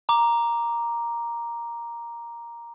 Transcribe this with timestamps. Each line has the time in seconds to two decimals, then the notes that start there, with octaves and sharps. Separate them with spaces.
0.09 A#5 D6